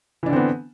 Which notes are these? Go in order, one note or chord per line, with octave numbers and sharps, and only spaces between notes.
D3 E3 B3 C4 D4